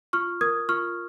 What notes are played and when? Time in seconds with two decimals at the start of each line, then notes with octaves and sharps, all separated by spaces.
0.13 F4 C#6 F6
0.41 A#4 D#6 G#6
0.69 F4 C#6 F6